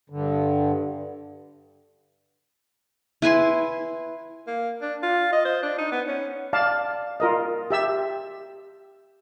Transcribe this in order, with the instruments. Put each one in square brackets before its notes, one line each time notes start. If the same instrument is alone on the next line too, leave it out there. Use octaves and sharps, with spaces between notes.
[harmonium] G2 D3
[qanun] E4 B4 G#5 C6
[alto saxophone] A#3
D4
F4
D#5
C5
D4
D#4
B3
C#4
[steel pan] D5 F5 A5
F4 A#4 D#5
G4 E5 E6